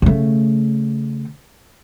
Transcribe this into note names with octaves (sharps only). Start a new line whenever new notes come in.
C#3 A3